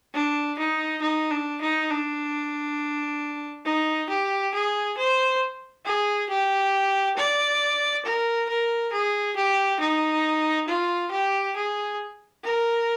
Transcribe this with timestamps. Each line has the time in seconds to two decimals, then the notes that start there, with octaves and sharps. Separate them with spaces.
0.14 D4
0.58 D#4
1.01 D#4
1.31 D4
1.61 D#4
1.90 D4
3.65 D#4
4.10 G4
4.54 G#4
4.98 C5
5.85 G#4
6.29 G4
7.17 D5
8.05 A#4
8.49 A#4
8.92 G#4
9.36 G4
9.80 D#4
10.68 F4
11.11 G4
11.56 G#4
12.44 A#4